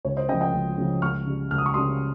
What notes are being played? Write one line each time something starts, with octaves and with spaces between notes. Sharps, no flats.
C#2 C#5
C5 D#5
C#3 F3 D#5 G5
D#5 G5
C#2
C#3 F3
C#2 C#6 F6
C#3 G3
C#2 F6
D#6
C#6
C#3 G3 C6 D#6